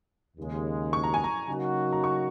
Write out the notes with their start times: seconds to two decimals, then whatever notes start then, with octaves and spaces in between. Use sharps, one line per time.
0.37 D#2 C#3 G#3
0.93 C#6
1.04 A#5
1.14 G#5
1.24 A#5
1.48 C#3 F#3 A#3 D#4 F#4
1.93 A#5
2.04 C#6